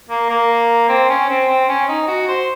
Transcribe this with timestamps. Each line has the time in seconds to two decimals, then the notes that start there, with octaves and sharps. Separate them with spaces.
0.09 A#3
0.29 A#3
0.89 C4
1.09 C#4
1.29 C4
1.48 C4
1.68 C#4
1.88 D#4
2.08 F#4
2.28 C5